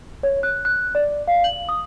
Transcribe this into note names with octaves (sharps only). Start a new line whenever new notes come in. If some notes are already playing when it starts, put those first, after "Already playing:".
C#5
F#6
F#6
D5
F5
F#7
D#6